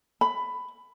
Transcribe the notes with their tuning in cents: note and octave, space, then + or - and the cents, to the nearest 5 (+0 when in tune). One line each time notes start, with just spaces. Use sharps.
B5 +15